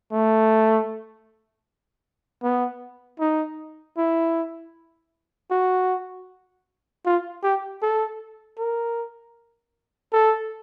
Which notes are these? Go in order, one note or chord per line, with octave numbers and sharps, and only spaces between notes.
A3
B3
D#4
E4
F#4
F4
G4
A4
A#4
A4